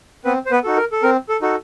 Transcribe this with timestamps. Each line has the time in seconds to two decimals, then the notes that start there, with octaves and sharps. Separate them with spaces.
0.25 B3 C4 B4
0.46 C5
0.51 B3 B4
0.64 D#4 F#4 A4
0.77 A#4
0.92 A4
1.03 C4 A#4
1.29 A4
1.42 D#4 F#4 A4